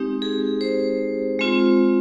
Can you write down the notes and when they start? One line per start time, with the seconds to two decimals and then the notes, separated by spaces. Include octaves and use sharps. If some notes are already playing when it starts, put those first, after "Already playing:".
Already playing: G#3 C4 D#4 G4
0.22 G#4
0.61 C5
1.39 G#3 C4 F4